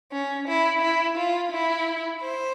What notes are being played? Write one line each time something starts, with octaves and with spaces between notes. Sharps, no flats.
C#4
E4
E4
F4
E4
C5